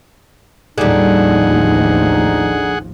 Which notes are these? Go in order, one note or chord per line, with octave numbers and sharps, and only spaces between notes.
A1 D#2 D3 F3 G3 D#4 G#4 F#5